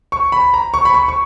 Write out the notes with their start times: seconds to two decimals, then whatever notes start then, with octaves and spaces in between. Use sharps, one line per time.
0.12 C#6
0.32 B5
0.54 A#5
0.74 C#6
0.85 B5
0.94 C#6
1.08 C#6